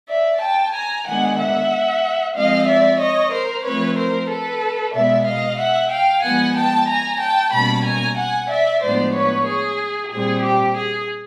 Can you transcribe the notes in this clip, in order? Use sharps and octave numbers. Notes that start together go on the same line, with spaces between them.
D5 E5
G5 A5
G#5 A#5
D#3 G#3 B3 D4 F#5 G#5
E5 F#5
F3 G#3 C4 D#5 F5
D5 E5
C#5 D#5
A#4 C5
F3 A3 C4 B4 C#5
A#4 C5
A4 B4
B2 G#3 B3 D5 E5
D#5 F5
E5 F#5
F5 G5
F3 G#3 B3 F#5 G#5
G5 A5
G#5 A#5
G5 A5
B2 G3 A#3 C#4 A5 B5
G#5 A#5
F#5 G#5
D5 E5
A2 F3 G#3 B3 D4 C5 D5
B4 C#5
G#4
A#2 G3 C4 G#4
G4
G#4